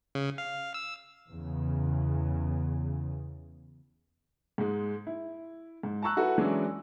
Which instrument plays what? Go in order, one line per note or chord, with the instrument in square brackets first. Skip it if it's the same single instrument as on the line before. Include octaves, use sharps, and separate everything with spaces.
[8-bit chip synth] C#3
F5
E6
[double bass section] E2 C#3
[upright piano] G#2 G#3
E4
G#2
A5 A#5 C#6 E6 F#6
E4 F#4 A4 B4
E3 F#3 G#3 C#4 D4